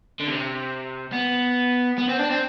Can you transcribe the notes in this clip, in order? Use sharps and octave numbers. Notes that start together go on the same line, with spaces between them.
D3
C3
B3
B3
C4
D4
C4